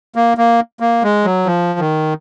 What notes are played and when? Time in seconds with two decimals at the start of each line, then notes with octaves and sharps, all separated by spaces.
0.16 A#3
0.37 A#3
0.80 A#3
1.03 G#3
1.25 F#3
1.46 F3
1.79 D#3